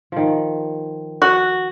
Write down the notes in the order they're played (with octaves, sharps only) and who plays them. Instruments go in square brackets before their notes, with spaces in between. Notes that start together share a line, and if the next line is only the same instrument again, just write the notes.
[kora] D#3 F3
[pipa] F#4